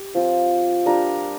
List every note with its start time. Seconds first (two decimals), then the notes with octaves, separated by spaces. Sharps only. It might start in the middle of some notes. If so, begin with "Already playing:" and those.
Already playing: G4
0.15 F3 C4 F4
0.86 G3 D4 F4 A#4